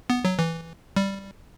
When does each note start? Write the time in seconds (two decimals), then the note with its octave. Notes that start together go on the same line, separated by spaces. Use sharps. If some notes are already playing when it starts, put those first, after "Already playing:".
0.10 B3
0.25 F#3
0.39 E3
0.97 G3